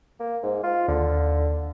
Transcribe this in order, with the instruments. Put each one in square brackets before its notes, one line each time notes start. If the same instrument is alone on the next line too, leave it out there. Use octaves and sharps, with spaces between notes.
[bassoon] A#3
G#2
F4
[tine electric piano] D#2 [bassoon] D3